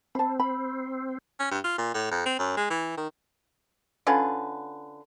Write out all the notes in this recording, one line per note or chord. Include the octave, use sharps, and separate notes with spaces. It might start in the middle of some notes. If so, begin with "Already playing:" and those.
C4 A5 B5
B5
C#4
G2
F4
A#2
A2
F2
C4
F#2
G#3
E3
D#3
D3 C#4 F4 B4